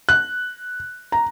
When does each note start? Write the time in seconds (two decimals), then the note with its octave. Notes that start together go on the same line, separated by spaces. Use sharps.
0.09 F#6
1.12 A#5